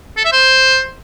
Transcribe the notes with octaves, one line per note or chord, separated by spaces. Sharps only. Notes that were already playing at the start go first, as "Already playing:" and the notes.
A4
E5
C5